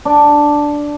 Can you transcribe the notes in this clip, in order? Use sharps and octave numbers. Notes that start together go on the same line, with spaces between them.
D4